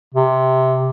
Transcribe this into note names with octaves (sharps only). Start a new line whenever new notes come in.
C3